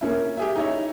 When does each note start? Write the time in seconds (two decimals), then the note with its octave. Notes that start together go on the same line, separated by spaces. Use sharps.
0.01 A#3 C#4 E4
0.37 G4 G#4 E5
0.56 D#4 E4 C#5